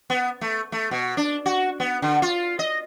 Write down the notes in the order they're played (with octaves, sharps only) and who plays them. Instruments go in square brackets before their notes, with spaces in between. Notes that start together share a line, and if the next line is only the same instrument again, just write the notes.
[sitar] B3
A3
A3
B2
D4
F#4
B3
D3
F4
D#5